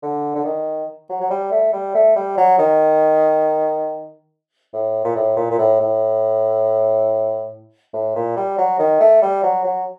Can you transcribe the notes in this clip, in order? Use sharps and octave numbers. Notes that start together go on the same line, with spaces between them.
D3
D3
D#3
F#3
F#3
G3
A3
G3
A3
G3
F#3
D#3
A2
A#2
A2
A#2
A#2
A2
A2
A2
A#2
G3
F#3
D#3
A3
G3
F#3
F#3